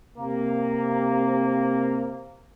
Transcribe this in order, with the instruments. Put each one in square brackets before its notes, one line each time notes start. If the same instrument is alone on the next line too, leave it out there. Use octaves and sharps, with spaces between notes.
[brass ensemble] C3 A#3